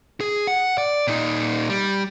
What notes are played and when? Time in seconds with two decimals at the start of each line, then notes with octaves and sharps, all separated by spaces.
0.21 G#4
0.47 F#5
0.78 D5
1.07 A#2 D#4
1.70 G3